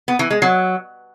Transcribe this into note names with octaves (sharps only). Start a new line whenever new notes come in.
B3
E3
G#3
F#3